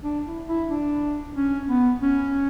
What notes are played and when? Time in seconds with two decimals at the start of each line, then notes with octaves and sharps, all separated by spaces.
0.04 D4
0.26 E4
0.48 E4
0.70 D4
1.35 C#4
1.69 B3
2.02 C#4